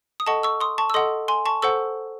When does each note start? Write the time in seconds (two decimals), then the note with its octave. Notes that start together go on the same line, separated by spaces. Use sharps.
0.20 D#6
0.27 A4 D#5 F#5 A5 C#6
0.43 C#6 E6
0.61 C6 D#6
0.78 A5 C#6
0.90 E6
0.94 A4 D#5 F#5 C6 D#6
1.28 G#5 C6
1.46 A5 C#6
1.62 A4 C5 F#5 C#6 E6